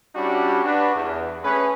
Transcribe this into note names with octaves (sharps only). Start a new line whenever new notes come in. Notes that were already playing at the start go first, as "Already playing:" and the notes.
G3 C#4 D4 E4 F#4 G4
D4 F#4 B4
E2
A3 C#4 G#4 B4